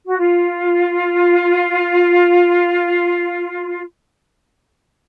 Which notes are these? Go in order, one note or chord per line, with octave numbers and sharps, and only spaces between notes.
F#4
F4